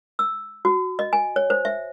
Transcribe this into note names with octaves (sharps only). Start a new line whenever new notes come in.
E6
F#4
D#5
G#5
C#5
C5
E5